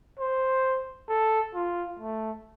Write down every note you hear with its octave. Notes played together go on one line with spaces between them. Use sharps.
C5
A4
F4
A3